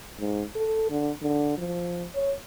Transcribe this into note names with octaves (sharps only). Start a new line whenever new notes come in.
G#2
A4
D3
D3
F3
C#5